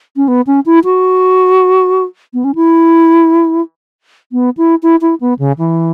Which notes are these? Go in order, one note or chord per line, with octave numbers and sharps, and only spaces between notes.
C#4
B3
C#4
E4
F#4
B3
C#4
E4
B3
E4
E4
E4
B3
C#3
E3